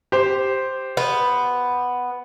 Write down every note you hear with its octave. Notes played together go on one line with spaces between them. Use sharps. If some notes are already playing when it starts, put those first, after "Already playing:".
G4 C5
B3